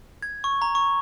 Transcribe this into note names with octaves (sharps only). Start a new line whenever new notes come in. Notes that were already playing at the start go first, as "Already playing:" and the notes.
G#6
C#6
A#5
C#6